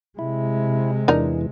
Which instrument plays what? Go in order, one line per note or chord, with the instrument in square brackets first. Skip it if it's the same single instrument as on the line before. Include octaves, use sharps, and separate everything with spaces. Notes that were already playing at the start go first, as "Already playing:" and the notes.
[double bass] C3 G#3 [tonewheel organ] E4
[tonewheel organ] E2 E3 [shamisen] D4 D#4 A#4